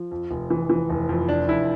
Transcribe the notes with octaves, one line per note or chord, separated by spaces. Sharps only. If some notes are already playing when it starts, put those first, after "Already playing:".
Already playing: F3
F2
F1
E3
E3
F1
F2
F1 D4
F1 E4